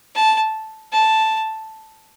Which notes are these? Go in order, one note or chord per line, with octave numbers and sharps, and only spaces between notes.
A5
A5